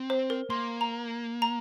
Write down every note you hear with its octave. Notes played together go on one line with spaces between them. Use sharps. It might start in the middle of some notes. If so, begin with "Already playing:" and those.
Already playing: C4
C5
A#4
A#3 C6
A#5
A#5